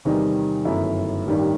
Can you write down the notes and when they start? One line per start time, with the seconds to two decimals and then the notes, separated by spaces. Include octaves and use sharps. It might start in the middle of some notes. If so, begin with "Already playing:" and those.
0.05 E2 C3 D#3 G3 D#4
0.65 G1 F#2 D#3 A3 E4
1.27 A1 G2 D#3 G3 D#4